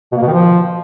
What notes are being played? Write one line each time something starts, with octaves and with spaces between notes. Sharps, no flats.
B2
A#3
B2
D#3
F3